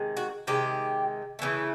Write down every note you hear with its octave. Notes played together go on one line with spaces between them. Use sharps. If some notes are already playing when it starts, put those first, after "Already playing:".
Already playing: C3 D#3 G#3
F#4
C3 D#3 G#3 G4
C#3 E3 A3